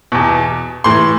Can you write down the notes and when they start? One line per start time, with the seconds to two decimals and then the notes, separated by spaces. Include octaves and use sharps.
0.12 E2 B2
0.84 A2 E3 C6